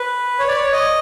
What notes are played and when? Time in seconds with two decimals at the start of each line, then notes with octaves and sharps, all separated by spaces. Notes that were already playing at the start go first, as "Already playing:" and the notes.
Already playing: B4
0.39 C#5
0.48 D5
0.56 C#5
0.72 D#5